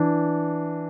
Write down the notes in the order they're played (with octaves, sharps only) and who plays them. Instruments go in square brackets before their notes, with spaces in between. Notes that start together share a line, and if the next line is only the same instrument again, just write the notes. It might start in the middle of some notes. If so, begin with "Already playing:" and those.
Already playing: [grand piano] E3 D4